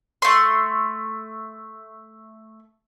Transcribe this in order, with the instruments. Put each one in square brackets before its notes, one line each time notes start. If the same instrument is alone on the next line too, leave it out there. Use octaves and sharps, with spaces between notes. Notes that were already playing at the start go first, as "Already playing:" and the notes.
[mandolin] A3 C6